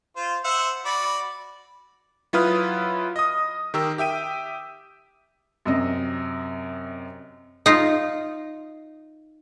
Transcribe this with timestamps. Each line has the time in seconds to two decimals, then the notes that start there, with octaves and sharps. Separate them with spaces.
0.16 F4 C5
0.44 C5 E5 F#5
0.85 F#4 D5 B5
2.33 F#3 E4 F4 B4 D#6 F6
3.16 D#5 D#6
3.74 D#3 G4 A#4 E6
3.98 G4 E5 G5 D#7
5.66 F#2 C3 D#5
7.66 D#4 F4